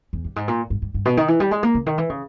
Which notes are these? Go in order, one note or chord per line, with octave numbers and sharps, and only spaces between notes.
E2
G2
G#2
A#2
G2
G2
G2
B2
D#3
E3
G3
G#3
A#3
C#3
D#3
E3
C#3